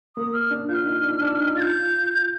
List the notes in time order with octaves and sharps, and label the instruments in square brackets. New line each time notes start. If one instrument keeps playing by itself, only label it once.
[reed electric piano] A#3 [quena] D#6
[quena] F6
[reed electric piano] D4
[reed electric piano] F4 [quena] F6 G6
[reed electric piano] D#4
D4
D4
D#4
[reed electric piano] F4 [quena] A6
[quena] G6